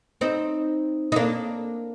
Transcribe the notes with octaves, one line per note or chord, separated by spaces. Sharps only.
C4 D#4
D#4
A#3 D4